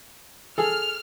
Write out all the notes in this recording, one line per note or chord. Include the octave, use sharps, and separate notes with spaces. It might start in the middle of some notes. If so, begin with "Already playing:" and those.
G#4 A4 F6